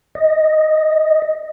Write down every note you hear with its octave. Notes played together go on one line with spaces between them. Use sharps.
D#5